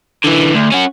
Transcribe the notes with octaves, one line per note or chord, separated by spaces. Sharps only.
D3 E3
D2
C#4 F#4